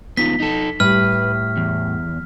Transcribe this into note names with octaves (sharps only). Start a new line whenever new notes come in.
B3 D#4 F4 B6
D#4 A4
A2 G3 B4 F6
E2